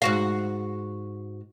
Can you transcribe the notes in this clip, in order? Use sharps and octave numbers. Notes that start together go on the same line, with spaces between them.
G#2 F#4 F5